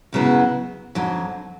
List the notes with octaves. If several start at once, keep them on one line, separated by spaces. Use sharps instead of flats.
F#2 C#3 F#3 B3 E4
F2 D3 F#3